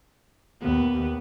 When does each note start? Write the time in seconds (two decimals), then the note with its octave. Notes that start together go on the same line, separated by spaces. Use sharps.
0.62 D#2 B3